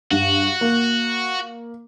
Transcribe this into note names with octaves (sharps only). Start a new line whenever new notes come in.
G2 F#4
A#3